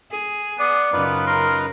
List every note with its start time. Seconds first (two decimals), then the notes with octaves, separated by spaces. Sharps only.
0.11 G#4
0.59 B3 D5
0.92 F#2 C#3 B3 D#4 F4 B4
1.27 A#4 C6